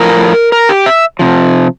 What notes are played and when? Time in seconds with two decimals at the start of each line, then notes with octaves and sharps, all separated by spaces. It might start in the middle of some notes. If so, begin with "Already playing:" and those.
Already playing: A2 F3 A#4
0.52 A#4
0.69 G4
0.86 E5
1.19 C3 F3